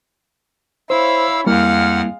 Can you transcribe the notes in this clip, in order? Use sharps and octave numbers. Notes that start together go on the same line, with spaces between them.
E4 C5 C#5 F5 E6
F2 G3 G#3 A#3 E4 F5 F#5 F6